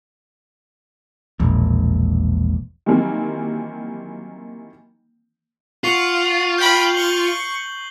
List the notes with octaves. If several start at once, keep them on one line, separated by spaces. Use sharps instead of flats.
E1 A#1
D#3 E3 F#3 G3 A#3 C4
F4 F#5 C#6 C7
G5 B5 G6 F#7
C#6 G7